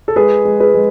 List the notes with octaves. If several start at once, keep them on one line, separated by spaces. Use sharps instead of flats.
A4
G#3 G#4 B4
G#3
G#4 B4
G#3